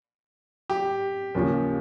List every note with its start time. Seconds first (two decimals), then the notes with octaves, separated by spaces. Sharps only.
0.70 G4
1.35 D#2 C#3 F3